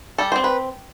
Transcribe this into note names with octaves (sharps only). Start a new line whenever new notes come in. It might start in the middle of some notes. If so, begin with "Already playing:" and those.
G3 A4
C4 C5
B4